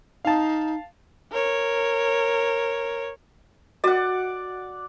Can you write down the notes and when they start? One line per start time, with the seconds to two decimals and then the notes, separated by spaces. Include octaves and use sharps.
0.25 D#4 F5 A5
1.31 A#4 C#5
3.84 F#4 A#4 D5 D#5 F#5